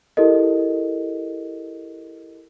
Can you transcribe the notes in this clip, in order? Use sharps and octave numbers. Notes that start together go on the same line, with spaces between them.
E4 G4 A4 A#4 D#5